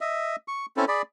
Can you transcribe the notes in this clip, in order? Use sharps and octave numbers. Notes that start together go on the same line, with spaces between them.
D#5 E5
C#6
C4 C#4 E4 A4
G#4 D5 B5